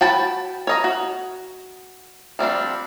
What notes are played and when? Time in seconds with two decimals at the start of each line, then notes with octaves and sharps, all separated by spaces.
0.01 F#4 G5 A5 B5
0.67 C#5 D#5 A#5
0.84 F#4
2.39 F3 G3 C4 D4